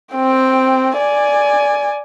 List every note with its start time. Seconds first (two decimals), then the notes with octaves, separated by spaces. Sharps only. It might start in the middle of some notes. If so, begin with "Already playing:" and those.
0.15 C4 G5
0.97 D5 G#5